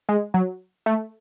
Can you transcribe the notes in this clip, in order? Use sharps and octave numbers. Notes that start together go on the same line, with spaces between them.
G#3
F#3
A3